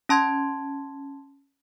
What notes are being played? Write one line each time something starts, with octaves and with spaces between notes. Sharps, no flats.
C#4 A5 C6 G#6